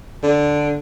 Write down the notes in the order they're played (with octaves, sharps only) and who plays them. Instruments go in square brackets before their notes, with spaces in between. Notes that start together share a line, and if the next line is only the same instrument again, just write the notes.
[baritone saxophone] D3